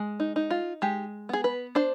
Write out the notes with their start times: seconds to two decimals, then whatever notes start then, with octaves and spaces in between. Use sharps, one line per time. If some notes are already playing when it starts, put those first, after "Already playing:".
Already playing: G#3
0.20 D#4
0.36 D#4
0.51 F4
0.82 G#3 G4
1.29 B3 G#4
1.44 B4
1.75 D4 C5